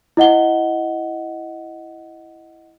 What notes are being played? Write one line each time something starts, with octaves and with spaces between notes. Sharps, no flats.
E4 D#5 F#5 G7